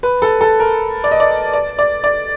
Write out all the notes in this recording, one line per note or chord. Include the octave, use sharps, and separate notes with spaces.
B4
A4
A4
A#4
D5
D#5
D5
D5
D5
D5